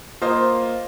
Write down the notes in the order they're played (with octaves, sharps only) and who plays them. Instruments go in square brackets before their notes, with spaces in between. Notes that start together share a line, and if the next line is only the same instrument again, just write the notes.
[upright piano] A#3 F4 C5 D#5